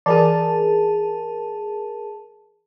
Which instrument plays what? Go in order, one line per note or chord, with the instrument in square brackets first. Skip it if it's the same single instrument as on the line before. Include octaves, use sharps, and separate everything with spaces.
[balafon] E3 [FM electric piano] G#4 A#4 A5